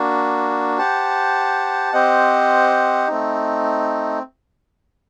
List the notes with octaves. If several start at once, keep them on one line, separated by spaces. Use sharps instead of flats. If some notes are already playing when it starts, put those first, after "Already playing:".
Already playing: A#3 D4 F#4
G4 C5 F#5 A5
C4 G4 C5 D#5 F#5
A3 C4 D#4